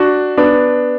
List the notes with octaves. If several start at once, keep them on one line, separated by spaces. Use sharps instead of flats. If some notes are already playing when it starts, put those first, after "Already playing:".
Already playing: D4 F#4
B3 D4